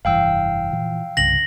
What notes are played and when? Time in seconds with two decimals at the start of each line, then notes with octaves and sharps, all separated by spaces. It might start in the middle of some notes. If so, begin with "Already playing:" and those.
0.05 F1 G2 E3 F5 G5 E6
0.72 A#2 E3 F3
1.17 C2 G2 C#3 A#6 F#7